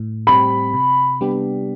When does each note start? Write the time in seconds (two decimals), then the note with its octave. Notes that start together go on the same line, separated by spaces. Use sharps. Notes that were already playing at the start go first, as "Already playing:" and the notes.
Already playing: A2
0.27 G3 C4 G4 B5
0.74 C3
1.21 G3 B3 D4 G4